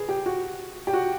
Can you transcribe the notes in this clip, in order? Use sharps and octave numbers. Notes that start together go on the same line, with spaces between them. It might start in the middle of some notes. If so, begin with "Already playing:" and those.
Already playing: G#4 B4
G4
F#4
G4
F#4